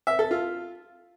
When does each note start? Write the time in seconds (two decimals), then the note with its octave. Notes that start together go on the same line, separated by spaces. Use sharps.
0.07 E5
0.19 A4
0.31 F4